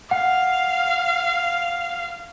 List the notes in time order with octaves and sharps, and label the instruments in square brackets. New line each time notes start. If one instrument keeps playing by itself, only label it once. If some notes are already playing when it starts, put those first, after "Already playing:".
[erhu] F5 [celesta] F#5